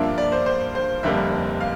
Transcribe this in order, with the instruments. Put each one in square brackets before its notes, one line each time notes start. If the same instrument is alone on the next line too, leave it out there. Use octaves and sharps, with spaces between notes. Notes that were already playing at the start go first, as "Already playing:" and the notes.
Already playing: [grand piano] G2 F3 A#3 D4 [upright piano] E5
[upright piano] D5
C5
C5
C5
[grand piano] F1 F2 D3 G3 A#3 [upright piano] E5
[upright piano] F5